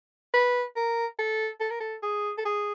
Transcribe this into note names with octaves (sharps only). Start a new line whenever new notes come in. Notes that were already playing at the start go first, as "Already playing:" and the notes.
B4
A#4
A4
A4
A#4
A4
G#4
A4
G#4